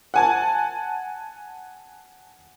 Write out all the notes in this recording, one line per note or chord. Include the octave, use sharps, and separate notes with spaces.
F#5 G#5 A5